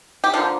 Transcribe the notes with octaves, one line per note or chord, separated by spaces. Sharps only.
G4
D3 F3 A#3 F4